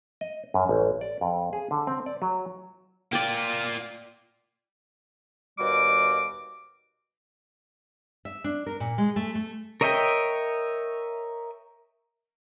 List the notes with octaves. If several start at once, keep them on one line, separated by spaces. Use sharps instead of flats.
D#5
F#2
A1
D5
F2
G#4
D3
C4
D5
F#3
A#3 F4 D5 G5
D#2 B2 G3 F#4 D6
E5
D4
A#4
A#2
G#3
A3
A3
A#4 C#5 D#5 E5 G5